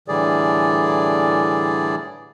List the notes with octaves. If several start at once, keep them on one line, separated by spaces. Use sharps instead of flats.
A2 D3 E3 G3 G#4 D5